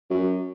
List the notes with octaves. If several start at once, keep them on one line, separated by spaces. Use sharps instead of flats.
F#2